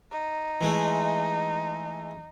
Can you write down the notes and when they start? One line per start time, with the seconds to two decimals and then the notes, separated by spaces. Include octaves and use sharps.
0.12 D#4
0.61 E3 G#3 A3